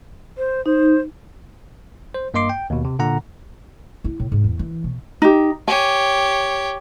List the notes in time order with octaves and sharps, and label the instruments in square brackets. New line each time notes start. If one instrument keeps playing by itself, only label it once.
[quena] C5
[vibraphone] D#4 [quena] C5
[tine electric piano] C5
G2 A#3 D#5 C6 D6 C7
G5
D#2 B2
C3
A#2 D3 F#5 A#5
[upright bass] E4
A2
G#2
E2
E3
B2
[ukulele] D#4 G4
[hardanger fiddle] G4 C#5 [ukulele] G#5